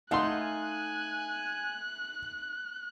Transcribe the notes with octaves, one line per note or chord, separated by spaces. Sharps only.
A3 D#4 F5 F#5 G#5 C6 F#6